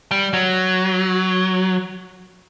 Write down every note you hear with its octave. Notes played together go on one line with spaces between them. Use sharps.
G3
F#3